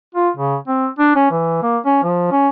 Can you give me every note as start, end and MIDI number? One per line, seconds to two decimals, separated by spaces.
0.15 0.29 65
0.37 0.56 49
0.68 0.87 60
0.99 1.11 62
1.16 1.29 61
1.31 1.59 52
1.63 1.78 58
1.85 2.00 61
2.03 2.29 53
2.31 2.49 61